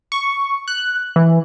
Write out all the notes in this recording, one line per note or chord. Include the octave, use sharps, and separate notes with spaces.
C#6
F#6
E3